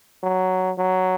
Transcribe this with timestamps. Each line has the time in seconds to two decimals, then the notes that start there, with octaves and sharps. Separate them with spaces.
0.23 F#3
0.78 F#3